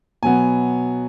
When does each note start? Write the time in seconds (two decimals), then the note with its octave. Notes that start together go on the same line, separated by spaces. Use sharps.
0.23 B2 F#3 B3 G#5